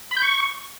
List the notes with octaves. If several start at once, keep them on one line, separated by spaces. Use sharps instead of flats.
B5
G6
C#6